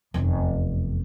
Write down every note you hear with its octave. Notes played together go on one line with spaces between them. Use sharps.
F1 E2